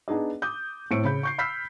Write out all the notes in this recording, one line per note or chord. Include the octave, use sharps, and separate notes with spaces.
B3 D4 D#4 G#4 D#5
D6 D#6 G6
A2 C4 C#7 D7
C#3 B5 G6
C#6 G6 C7
B5 E6 F6 G6 B6 C7